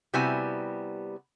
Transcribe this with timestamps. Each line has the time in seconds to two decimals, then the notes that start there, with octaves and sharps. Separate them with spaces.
0.14 C3 G3 B3 E4 F#4 G#5